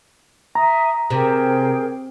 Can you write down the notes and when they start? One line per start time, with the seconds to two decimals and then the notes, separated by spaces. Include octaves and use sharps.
0.55 E5 G#5 A#5 D#6
1.10 C3 G#4 A#4 G5